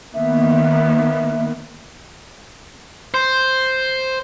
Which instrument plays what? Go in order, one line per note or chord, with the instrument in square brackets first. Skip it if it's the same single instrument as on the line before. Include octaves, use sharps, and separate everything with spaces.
[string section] D#3 A#3 B3 [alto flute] E5
[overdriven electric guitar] C5